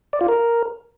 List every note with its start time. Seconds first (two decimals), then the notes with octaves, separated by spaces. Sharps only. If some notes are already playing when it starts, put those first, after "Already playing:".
0.13 D5
0.21 F4
0.28 A#4